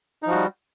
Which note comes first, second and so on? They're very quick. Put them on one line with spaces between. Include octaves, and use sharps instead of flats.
D#4 F3 F#4 G3